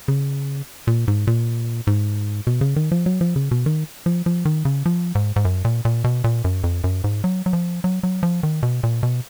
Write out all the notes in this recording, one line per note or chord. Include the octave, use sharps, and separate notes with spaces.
C#3
A#2
G#2
A#2
G#2
B2
C#3
D#3
F3
F#3
F3
C#3
B2
D#3
F3
F3
D#3
C#3
F3
G#2
G#2
F#2
A#2
A#2
B2
A#2
F#2
F2
F#2
G#2
F#3
F#3
F3
F#3
F#3
F3
D#3
B2
A#2
B2